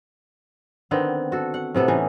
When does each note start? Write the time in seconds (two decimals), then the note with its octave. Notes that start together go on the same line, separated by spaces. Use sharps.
0.91 D3 D#3 B3 C4
1.32 F#4 A4
1.54 F#5
1.75 A2 C3 B3 A4
1.88 E3 C#4 D#4